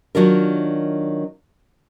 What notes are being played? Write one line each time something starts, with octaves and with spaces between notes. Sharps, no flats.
D#3 F#3 D4 F4 A#4